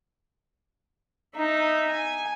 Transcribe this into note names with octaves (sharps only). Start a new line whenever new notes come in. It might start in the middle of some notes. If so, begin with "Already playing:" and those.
D#4 E5
G#5